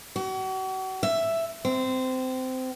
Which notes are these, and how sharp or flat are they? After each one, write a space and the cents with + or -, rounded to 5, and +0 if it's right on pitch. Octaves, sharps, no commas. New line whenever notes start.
F#4 +40
E5 +5
C4 -20